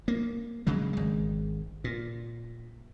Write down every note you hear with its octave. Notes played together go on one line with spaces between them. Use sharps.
A#3
C#3 F#3 G#3
G#1 G#3
A#2